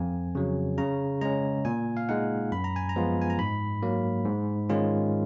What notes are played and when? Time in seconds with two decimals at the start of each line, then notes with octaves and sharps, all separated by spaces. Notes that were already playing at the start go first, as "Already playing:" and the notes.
Already playing: F2 G#5
0.35 C#3 F#3
0.78 C#3 A#5
1.21 G#3 C#4 A#5
1.65 A#2 G#5
1.97 F5
2.09 G#3 D#4 F#5
2.52 F#2 B5
2.64 A#5
2.76 G#5
2.89 A#5
2.96 F3 G#3 B3 F4
3.22 G#5
3.30 A#5
3.39 G#2 B5
3.82 F#3 A#3
4.25 G#2
4.69 D#3 G#3 C#4 F4